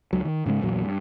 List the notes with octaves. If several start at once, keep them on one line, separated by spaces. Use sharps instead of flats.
C#2 F#3
D#3
G#2 C#3 E3 G#3
A#1 E2 A#2 F#3
G2